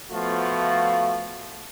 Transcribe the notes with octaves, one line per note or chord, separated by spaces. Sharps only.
F3 A3 B3 F4 F#4